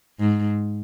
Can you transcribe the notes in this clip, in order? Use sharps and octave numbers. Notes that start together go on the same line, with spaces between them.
G#2